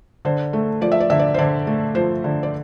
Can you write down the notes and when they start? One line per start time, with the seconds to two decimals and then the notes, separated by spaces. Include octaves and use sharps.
0.25 D3 C5
0.53 A3
0.81 F3 D5
0.92 E5
1.00 D5
1.10 D3 E5
1.19 D5
1.34 C5
1.38 D3 D5
1.67 A3
1.95 F3 C5
2.24 D3
2.43 D5